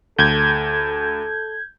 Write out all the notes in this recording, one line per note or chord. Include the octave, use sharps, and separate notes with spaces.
D2 A4 G6 G#6